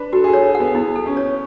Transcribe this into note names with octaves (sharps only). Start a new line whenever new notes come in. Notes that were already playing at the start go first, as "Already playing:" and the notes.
Already playing: D4 B4
F#4 A4
G#4
A4 C#5
G#4
F#5
B3
B3 E4
A4
C#4
C#5